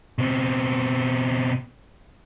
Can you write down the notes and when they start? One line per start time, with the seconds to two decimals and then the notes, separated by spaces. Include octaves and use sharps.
0.18 B2 C4